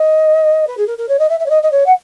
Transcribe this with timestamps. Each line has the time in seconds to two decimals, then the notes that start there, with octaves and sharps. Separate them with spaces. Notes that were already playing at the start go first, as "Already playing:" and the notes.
Already playing: D#5
0.67 B4
0.77 G#4
0.87 A#4
0.98 A#4
1.09 C#5
1.19 D#5
1.29 E5
1.40 E5
1.46 C#5
1.50 D#5
1.63 D#5
1.72 C#5
1.86 F#5